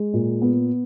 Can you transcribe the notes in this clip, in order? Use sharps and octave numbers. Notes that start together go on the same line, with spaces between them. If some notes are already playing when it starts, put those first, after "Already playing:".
Already playing: G#3
A#2
B3